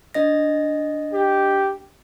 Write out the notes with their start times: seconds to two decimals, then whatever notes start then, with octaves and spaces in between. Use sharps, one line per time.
0.14 D4 D#5 A#6
1.13 G4